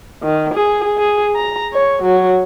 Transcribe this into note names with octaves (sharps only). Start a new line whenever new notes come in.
D#3
G#4
G#4
A#5
C#5
F#3